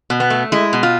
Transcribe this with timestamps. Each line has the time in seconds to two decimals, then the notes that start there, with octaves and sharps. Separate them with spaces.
0.10 B2
0.20 B3
0.30 A3
0.52 G#3 E4
0.73 B2
0.83 F4